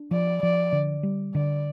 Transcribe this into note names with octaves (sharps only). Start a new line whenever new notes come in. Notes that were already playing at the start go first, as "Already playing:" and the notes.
Already playing: D4
F3 D5
F3 D5
D3
G3
D3 D5